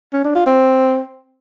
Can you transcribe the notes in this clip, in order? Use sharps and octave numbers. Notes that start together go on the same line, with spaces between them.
C#4
D4
F4
C4